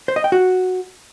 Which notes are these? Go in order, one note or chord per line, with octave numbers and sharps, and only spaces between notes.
C5
D#5
G5
F#4